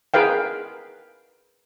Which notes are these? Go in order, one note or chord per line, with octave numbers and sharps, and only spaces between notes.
G#4 A#4 B4 F5 G5